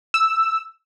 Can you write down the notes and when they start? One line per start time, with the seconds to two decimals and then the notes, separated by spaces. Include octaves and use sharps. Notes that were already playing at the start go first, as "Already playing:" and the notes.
0.14 E6